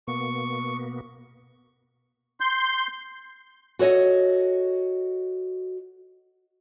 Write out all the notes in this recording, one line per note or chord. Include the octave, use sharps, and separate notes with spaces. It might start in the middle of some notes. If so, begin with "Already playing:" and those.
B2 A#3 B3 C#6
C6 G6
F#4 A4 C#5 D#5